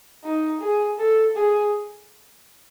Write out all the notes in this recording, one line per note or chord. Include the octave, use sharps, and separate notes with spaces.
D#4
G#4
A4
G#4